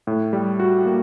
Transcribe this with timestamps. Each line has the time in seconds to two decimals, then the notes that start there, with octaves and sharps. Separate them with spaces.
0.07 A2
0.33 G3
0.60 F#4
0.86 A#3